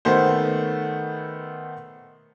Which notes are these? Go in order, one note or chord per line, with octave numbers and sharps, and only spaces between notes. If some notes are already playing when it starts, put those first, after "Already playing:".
D#3 A3 B3 C5